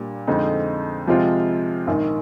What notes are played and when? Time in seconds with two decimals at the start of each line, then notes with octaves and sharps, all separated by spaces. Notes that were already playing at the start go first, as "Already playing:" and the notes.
Already playing: A#2 G3 D4
0.27 F2 D3 G#3 C4 D#4
1.07 C3 F3 G#3 C4 F4
1.87 A#1 G#2 D#3